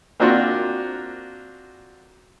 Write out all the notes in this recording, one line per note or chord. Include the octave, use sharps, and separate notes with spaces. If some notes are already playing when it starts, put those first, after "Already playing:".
A#3 C4 D4 F4 F#4